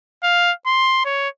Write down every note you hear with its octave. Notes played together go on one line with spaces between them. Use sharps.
F5
C6
C#5